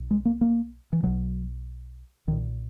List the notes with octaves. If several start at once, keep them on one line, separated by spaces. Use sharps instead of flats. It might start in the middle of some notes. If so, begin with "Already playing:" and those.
Already playing: B1 B2
G#3
A#3
A#3
E3
B1 B2 F#3
B1 A#2 D#3